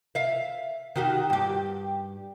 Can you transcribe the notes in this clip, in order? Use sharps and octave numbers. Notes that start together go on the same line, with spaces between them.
E5 F5
D#3 F#4 G4
G2 G4